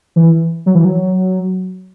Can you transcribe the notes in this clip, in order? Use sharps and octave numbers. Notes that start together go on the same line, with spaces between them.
E3
F#3
E3
F#3